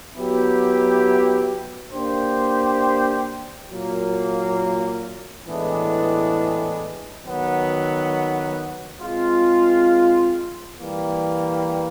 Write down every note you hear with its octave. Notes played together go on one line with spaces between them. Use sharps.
F#3 B3 E4 G4
A#3 D4 G4 C5
A#2 F#3 A#3
A2 E3 G#3 B3 D4
D#3 F#3 B3
G#3 C4 F4
E3 G3 A#3